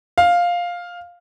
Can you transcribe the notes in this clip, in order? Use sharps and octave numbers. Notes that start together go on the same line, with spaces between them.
F5